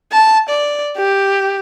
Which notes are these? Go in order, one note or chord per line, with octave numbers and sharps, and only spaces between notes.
A5
D5
G4